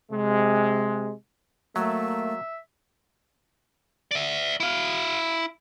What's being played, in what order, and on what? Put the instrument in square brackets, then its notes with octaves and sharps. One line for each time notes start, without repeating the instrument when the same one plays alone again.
[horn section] C3 G#3
[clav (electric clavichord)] F#3 [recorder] A3 [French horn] A#3 [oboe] E5
[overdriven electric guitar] D5 E5
E4 F5